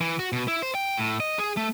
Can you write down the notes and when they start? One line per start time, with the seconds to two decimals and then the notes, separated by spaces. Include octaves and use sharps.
0.01 E3
0.19 F#4
0.33 B2
0.48 E4
0.62 C5
0.75 G5
0.98 A2
1.20 D#5
1.39 G#4
1.57 A3